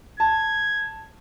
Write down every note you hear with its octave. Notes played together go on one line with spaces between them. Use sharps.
A5 G#6